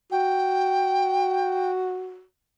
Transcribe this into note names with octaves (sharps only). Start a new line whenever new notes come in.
F#4 G5